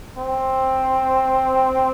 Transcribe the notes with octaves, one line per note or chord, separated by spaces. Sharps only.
C4